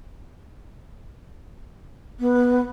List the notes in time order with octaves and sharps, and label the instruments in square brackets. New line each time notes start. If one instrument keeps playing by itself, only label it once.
[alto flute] B3